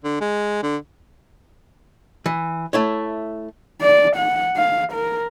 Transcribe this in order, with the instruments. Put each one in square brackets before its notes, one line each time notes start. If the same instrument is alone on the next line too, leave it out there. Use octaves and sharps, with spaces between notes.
[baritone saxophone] D3
G#3
D3
[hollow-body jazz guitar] E3
A3 E4 C#5
[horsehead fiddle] D5
F#5
F5
A#4